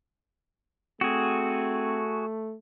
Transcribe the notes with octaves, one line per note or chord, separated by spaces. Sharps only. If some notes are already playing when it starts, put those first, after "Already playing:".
A3 C4 F#4 G#4